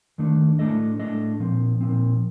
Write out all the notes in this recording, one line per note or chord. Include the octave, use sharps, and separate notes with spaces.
D#2 D#3 A3 D4
A2 A3 D4 A4 D#5
A2 A3 D4 A4 D#5
A#2 F3 C4
A#2 F3 C4